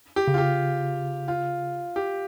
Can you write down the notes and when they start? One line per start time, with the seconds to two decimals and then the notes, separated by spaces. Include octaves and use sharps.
0.16 G4
0.27 C#3
0.34 F4
0.38 G4
1.28 F4
1.96 G4